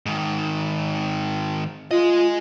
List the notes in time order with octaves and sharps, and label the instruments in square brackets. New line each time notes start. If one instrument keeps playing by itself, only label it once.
[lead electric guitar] G#2 D#3
[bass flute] F4 [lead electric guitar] G#4 D#5